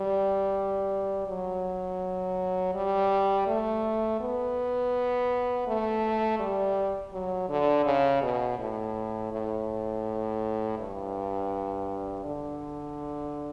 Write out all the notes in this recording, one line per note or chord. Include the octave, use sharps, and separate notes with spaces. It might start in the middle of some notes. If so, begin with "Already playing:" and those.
Already playing: G3
F#3
G3
A3
B3
A3
G3
F#3
D3
C#3
B2
A2
A2
G2
D3